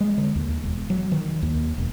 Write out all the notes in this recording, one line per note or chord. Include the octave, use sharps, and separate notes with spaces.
G#3
D3
D#2
E1
F#3
D#3
D#2
E1